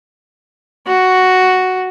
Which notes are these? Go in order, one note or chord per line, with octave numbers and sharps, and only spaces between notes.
F#4